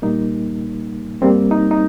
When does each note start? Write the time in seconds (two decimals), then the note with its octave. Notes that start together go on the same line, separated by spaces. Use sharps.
0.02 A#2 G3 A#3 D#4
1.21 G2 G3 A#3 C4
1.51 D#4
1.71 D#4